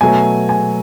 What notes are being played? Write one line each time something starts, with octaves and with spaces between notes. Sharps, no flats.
B2 F#3 A3 G#5
G#5